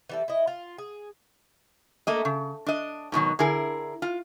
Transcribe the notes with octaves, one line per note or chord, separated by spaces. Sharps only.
E3 G3 A4
E4 D#5
F4
G#4
A3 A#3 D#5
C#3
D4 D#5
G#2 B2 D#3 F#3
D3 E4 G#4 A#4
F4